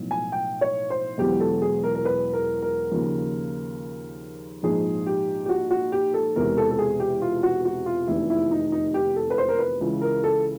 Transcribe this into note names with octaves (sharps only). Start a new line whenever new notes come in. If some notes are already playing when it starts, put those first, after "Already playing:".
Already playing: B1 A2 F3
G#5
G5
C#5
C5
E1 E2 B2 F#3 G4
A4
G#4
A#4
A#4
B4
A#4
A#4
D#2 C#3 F3
A#1 G#2 F3 G#4
G4
G4
F#4
F#4
G4
A4
E1 E2 C3 A#4
A4
A4
G#4
G4
F4
F#4
F#4
F4
F1 E2 C3 D#3 E4
E4
D#4
D#4
G4
A4
B4
C5
A#4
B4
C#2 C#3 E3
A#4
A4